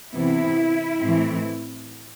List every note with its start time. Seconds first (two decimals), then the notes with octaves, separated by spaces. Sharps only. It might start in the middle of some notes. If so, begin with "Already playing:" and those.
0.13 C3 E3 B3 E4
1.03 A2 E3 A3 C4